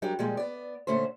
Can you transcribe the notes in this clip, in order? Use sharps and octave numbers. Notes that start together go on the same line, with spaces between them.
F#3 G3 D4 G4 A#4
A#2 F3 G3 G#3
B3 D5
A#2 D3 A3 C#4 C5